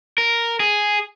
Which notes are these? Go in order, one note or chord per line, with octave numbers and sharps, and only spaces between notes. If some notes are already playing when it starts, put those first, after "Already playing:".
A#4
G#4